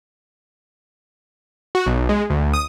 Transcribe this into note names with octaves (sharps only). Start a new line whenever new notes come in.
F#4
B1
G#3
D2
D#6